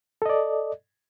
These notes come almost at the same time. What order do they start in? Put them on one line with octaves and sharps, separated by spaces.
A4 D#5 D5